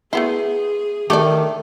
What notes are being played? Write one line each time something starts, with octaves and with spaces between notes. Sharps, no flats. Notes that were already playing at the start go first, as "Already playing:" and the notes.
A3 B3 E4 G#4 C6
D#3 A3 G4 A4 D5